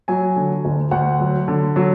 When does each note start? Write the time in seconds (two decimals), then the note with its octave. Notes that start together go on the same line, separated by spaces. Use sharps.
0.08 F#3 G#5
0.36 D3
0.65 D2
0.91 D2 F#5
1.20 F#3
1.48 D3
1.76 F#3